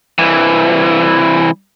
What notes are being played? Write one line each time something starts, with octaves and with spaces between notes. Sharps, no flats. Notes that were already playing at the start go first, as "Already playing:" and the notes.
C2 E3